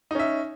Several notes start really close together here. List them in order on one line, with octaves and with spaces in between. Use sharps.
D#4 C#4 E5